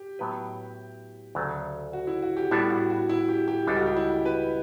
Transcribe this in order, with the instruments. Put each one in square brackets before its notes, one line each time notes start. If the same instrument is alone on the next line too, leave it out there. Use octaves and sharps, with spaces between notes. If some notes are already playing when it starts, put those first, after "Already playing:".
Already playing: [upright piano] G4
[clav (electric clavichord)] A2 F#3 B3 E4 B4
D2 C#3 F#3 A3
[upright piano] F#4
E4
F#4
G4
[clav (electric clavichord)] A2 G3 B3 D4 A4 [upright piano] E4
[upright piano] F#4
F#4
E4
G4
G4
[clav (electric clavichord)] C#2 C#3 G3 D4 A4 [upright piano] G4
[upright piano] F#4
G4
E4
B4